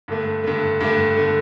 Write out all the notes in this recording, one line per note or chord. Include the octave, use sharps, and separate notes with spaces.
G2 D3 A3
G2 D3 A3
G2 D3 A3
D3 A3